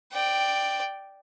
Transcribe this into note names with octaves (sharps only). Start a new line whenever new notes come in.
D5 G5